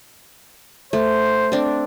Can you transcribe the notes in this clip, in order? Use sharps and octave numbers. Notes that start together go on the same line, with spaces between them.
A3 C5
C4 D4